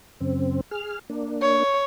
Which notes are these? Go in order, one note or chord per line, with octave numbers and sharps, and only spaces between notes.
F#2 C#3 C4
G#4 F6
A#3 D4
C#5